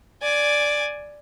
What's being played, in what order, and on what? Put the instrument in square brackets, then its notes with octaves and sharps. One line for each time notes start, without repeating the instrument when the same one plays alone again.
[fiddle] D5 G#5